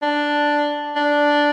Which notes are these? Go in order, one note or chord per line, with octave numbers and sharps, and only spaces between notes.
D4
D4